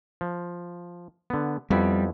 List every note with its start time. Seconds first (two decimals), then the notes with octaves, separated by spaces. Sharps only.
0.21 F3
1.30 D3 B3
1.70 F2 G3 B3 E4